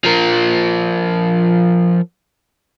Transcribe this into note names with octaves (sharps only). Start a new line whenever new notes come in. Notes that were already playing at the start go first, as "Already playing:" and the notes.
F3 A#4